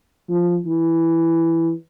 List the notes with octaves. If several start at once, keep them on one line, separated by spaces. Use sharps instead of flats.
F3
E3